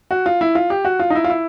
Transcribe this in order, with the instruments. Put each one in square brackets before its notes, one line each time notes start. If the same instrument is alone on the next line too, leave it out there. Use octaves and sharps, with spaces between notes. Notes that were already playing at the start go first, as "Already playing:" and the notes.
[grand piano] F#4
F4
E4
F4
G4
F#4
F4
D#4
E4
F4
E4